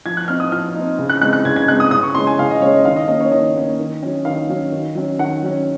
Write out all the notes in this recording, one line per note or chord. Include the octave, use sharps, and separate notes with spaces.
F3 G#6
F#6
C4 D#4 F6
D#6
F3 F6
C4 D#4
C#3
F#6
G#3 C4 D#4 F#6
F#6
C#3 G#6
G#6
G#3 C4 D#4 F#6
D#6
C#3 D#6
C#6
G#3 C#4 C6
G#5
C#3 F5
D#5
G#3 C#4 C#5
D#5
D#3 F5
D#5
A#3 C#4 D#5
C#5
D#3 D#5
A#3 C#4
D#3
F#3 C#4
D#3 F5
F#3 C#4
D#3
F#3 C#4
D#3 F#5
F#3 C#4